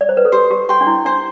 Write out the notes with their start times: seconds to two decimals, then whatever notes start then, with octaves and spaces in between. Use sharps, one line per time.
0.01 D5
0.09 C5
0.17 B4
0.25 A4
0.32 G4 C5
0.51 G4
0.69 G4 G5 C6
0.81 D4
0.87 E4
1.05 D4 C5